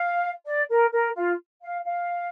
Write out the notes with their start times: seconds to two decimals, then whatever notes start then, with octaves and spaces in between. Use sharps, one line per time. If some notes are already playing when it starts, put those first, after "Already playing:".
Already playing: F5
0.46 D5
0.70 A#4
0.92 A#4
1.15 F4
1.62 F5
1.85 F5